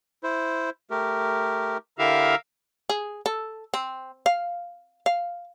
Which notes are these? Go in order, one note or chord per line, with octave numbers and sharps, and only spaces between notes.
E4 C5
A3 G4 A#4
D3 E4 G4 A#4 E5 F5
G#4
A4
C4
F5
F5